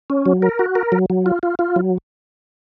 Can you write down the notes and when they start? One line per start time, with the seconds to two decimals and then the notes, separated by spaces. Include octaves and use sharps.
0.10 C#4
0.26 F#3
0.42 A#4
0.59 F#4
0.75 A#4
0.92 F#3
1.10 F#3
1.26 F4
1.43 F4
1.59 F4
1.76 F#3